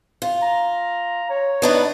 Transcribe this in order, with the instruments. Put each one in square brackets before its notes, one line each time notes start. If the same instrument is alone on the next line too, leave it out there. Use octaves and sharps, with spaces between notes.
[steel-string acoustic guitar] F4
[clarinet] A#5
C#5
[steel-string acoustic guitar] B3 D4 D#4